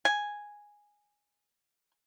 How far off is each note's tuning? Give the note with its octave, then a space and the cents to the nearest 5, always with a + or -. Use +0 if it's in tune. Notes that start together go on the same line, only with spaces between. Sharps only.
G#5 -5